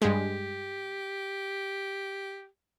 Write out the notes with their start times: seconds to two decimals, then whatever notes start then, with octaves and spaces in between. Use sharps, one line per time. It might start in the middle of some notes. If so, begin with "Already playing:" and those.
0.02 G2 G#3 G4